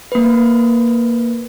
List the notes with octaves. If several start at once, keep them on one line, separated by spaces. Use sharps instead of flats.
A#3 B4